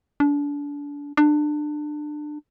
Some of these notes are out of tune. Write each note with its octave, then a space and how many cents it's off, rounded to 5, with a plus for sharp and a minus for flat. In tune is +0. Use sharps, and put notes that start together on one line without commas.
D4 -30
D4 +25